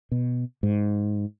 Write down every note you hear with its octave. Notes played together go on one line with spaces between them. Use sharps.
B2
G#2